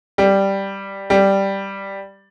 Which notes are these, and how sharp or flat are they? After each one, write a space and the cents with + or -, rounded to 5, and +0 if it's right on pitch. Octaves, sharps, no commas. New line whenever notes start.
G3 +0
G3 +0